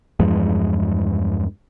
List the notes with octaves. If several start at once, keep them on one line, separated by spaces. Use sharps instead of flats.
E2 G2 F3 G#3